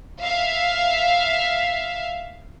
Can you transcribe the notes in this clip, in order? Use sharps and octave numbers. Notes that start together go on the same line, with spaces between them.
E5 F5